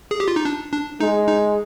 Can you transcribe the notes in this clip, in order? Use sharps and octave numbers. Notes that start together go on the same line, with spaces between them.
G#4
G4
F4
D#4
D4
D4
G#3 D#4
D#4